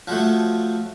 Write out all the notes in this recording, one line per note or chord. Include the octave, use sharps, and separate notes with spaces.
F3 F#3 A3